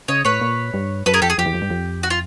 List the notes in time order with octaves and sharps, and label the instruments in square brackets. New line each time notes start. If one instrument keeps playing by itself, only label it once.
[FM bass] C#3 [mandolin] C#5 D#5
[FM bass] A2 [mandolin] B4 C#5
[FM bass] A#2
G2
[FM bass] F#2 [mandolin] A4 B4
[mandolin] G#4 A#4
[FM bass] F2 [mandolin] G4 A4
[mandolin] G#4
[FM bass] F2 [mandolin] G4
[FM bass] E2
F2
G2
F2
[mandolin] F#4
F4